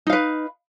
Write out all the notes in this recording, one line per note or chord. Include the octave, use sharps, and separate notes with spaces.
D#4 B4 F5